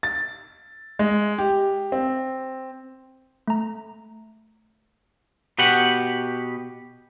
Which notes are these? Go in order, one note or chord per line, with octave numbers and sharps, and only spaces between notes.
A6
G#3
G4
C4
A3 A#5
B2 G4 B4 F#5